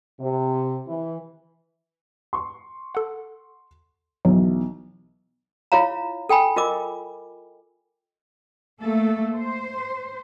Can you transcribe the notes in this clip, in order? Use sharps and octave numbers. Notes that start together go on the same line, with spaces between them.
C3
E3
C6 C#6
A4 F#5
B1 E3 F#3
E4 F4 C#5 F5 A#5
A4 G5 G#5 B5
F4 A#4 D#5 D6
A3 A#3 A4
C5